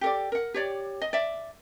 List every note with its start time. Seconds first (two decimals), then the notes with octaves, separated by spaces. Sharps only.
0.01 G4 A4 D5
0.32 A#4 F#5
0.54 G4 C#5 D5
1.01 D#5
1.13 D5 E5